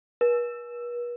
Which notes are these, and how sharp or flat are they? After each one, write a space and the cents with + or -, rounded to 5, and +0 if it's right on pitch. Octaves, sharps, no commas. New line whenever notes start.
B4 -45